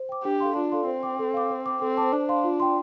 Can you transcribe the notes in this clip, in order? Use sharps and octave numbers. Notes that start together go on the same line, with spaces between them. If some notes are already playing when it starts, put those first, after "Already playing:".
Already playing: C5
G5 D6
D4 G4
A4 F5 C6
D4 F4
A4 D5 F5 C6
C4 C5
G5 D6
A4
F5 D6
C5
G5 D6
C4 A4
C5 A5 D6
D4 C5
F5 C6
F4
D5 G5 C6